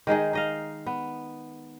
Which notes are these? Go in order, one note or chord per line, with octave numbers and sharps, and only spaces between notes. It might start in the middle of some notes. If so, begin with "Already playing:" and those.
D#3 G#3 D#4 G#4
D#4 D#5 F5
B3